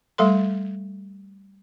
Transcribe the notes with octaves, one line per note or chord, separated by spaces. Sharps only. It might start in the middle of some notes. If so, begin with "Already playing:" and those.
G3 A3 A4 C6